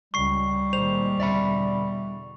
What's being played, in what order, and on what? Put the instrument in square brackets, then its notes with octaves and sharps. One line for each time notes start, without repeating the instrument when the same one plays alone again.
[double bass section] C#2 [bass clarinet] G3 [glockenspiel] C#6 C7
[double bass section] A#2 D#3 G#3 [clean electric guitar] C5 [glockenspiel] F7
[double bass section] E2 B2 D3 [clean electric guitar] D5 E5 B5